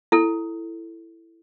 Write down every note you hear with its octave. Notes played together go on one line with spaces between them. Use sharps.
E4 A4